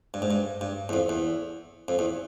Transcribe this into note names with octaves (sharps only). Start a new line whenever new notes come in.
G2
G#2
G2
G2
E2
F2
E2
F2
E2